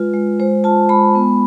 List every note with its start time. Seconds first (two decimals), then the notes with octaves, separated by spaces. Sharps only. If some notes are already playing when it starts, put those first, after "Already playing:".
Already playing: G#3 F4 B4
0.14 G#3
0.39 G#3 C5
0.64 F4 A5
0.89 G#3 B5
1.15 B3